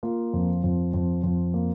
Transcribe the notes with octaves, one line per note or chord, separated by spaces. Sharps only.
A#3 F4
F2
F2
F2
F2
A#3